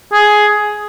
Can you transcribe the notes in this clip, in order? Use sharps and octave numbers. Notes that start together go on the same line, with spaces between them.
G#4